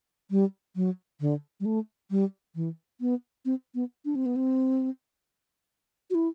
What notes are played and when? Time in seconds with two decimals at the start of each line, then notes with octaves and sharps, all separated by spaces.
0.31 G3
0.76 F#3
1.20 D3
1.60 G3
1.65 A3
2.11 G3
2.55 E3
3.01 B3
3.45 C4
3.75 B3
4.05 D4
4.15 C4
4.26 B3
4.36 C4
6.10 F#4
6.15 E4